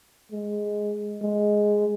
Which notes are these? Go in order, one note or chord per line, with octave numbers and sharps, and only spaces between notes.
G#3
G#3